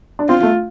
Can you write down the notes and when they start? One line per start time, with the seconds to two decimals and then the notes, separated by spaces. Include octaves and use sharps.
0.19 D4
0.29 C4 F4
0.43 A3